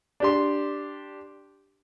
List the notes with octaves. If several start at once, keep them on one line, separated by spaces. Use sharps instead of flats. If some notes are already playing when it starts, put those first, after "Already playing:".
D4 G4 C6